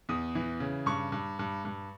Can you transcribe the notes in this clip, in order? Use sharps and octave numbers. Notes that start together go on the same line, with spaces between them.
E2 D#6
E3
C#3
G2 C#6
G2
G2
G2